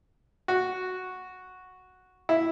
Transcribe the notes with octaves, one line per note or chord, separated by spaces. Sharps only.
F#4
E4